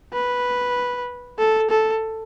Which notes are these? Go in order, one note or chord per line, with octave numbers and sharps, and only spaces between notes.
B4
A4
A4